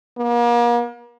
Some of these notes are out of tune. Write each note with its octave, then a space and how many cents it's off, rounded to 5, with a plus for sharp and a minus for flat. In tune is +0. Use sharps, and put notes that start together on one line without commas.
A#3 +40